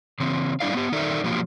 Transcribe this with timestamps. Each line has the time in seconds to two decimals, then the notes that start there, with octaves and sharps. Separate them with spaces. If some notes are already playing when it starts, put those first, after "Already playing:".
0.20 C#3 E3 C4
0.60 G3 D4 E4 D5 F5
0.74 B3 G4
0.92 D#3 D#4 A4 A#4 D5 E5
1.24 B2 F3 F#3 A#3 F4 G4